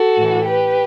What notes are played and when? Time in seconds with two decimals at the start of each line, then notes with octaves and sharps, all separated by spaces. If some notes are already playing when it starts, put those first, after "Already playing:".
Already playing: F#4 A4
0.16 A2 E3
0.46 G4 B4